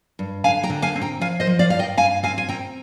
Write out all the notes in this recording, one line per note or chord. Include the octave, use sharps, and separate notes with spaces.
G2
D3 F5 G#5
G5 A#5
D3
F5 G#5
C4
G5 A#5
F3 F5 G#5
C5 D#5
F3
D5 F5
G2 F5
D#5 G5
G2 F5 G#5
C4 F5 G#5
G#5
C4 G5 A#5